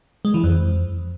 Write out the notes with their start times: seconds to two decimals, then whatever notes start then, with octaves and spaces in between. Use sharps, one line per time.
0.25 G#3
0.34 E3
0.44 F2